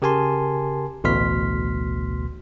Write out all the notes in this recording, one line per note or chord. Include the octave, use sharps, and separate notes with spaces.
C#3 G4 A#4 G#5 A5 C6
A1 D2 B2 C6 F6 B6